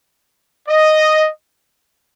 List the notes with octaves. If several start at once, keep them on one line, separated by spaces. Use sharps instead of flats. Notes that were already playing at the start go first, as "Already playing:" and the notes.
D#5